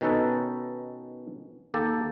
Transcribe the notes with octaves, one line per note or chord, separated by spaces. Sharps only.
B2 D#3 C#4 D#4 A4 B4
D#2 A#3 G4 A4